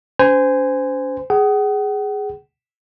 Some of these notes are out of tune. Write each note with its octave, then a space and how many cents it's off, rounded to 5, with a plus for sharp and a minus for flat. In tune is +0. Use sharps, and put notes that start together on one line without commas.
C#4 +45 C5 -25 G#5 -10
G#4 +0 F#5 +40